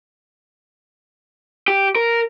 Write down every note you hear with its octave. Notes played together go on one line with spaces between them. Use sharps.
G4
A#4